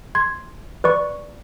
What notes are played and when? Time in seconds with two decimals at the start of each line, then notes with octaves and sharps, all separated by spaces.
0.15 C6 G#6
0.84 B4 D5 C#6